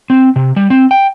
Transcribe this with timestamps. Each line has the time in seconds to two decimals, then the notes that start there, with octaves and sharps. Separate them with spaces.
0.10 C4
0.36 C3
0.56 G3
0.70 C4
0.91 G5